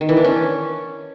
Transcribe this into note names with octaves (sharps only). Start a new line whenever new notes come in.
D#3
E3
D4
C#4